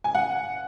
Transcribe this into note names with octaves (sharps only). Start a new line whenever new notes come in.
G#5
F#5